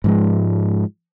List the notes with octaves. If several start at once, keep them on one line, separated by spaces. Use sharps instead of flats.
G#2 F3 G#3